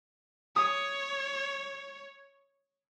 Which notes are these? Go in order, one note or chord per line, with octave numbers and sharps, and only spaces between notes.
C#5 D#6